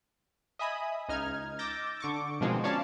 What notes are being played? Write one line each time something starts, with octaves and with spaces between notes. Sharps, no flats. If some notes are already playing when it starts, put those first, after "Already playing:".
D#5 E5 G#5 B5 D#6
C#2 D#4 F6 G#6
D6 E6 G6 A6 A#6
D3 C#6 D6
B2 D#3 F3 G#3 C4 D#4
C#4 C#5 D5 F5 A5